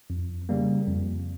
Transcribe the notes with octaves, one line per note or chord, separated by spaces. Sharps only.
F2
C#3 G3 A#3
F2